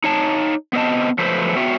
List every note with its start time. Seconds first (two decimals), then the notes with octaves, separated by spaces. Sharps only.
0.04 D#4 C#5 A5
0.73 B3 C4 D#5 A5
1.18 F3 F#3 A3 B4 C5
1.57 B3 F#4 C#5 E5 G5